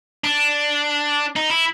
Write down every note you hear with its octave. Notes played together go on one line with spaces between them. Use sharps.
D4
D#4
E4